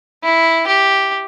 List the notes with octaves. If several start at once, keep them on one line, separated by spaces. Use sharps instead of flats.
E4
G4